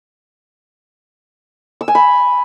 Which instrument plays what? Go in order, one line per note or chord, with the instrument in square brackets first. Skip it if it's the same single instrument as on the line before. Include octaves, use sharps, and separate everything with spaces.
[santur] E6
G#5
B5